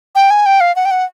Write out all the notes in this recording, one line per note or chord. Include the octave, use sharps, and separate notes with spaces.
G5
G#5
G5
F5
F#5
G5
F#5